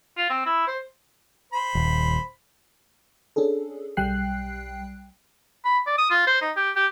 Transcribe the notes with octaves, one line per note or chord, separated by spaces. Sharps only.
F4
C4
E4
C5
C5 B5
D#1
C#4 D4 G#4 A4
B1 G3 G5 F#6 C7
B5
D5
D#6
F4
C5
D#4
G4
G4